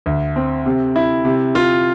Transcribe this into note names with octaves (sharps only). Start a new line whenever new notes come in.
D2
C4
C3
E4
C3
F4